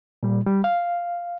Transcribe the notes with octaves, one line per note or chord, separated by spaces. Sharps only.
A#2 G3
G3
F5